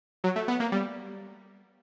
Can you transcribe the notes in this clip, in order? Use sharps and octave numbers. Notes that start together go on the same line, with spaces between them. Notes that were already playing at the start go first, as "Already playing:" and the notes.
F#3
A3
B3
A#3
G3